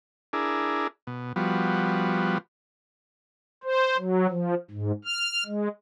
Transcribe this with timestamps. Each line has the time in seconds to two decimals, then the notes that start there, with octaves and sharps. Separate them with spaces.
0.33 D4 E4 G#4 A#4
1.07 B2
1.36 F3 G3 B3 F#4
3.63 C5
3.98 F#3
4.30 F3
4.71 G#2
5.05 F6
5.46 G#3